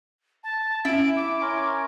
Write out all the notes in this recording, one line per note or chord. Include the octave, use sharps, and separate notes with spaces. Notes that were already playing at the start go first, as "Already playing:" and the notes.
A5
C#4 E4 D7
E5 D6
C#4 A#4 G#5 C6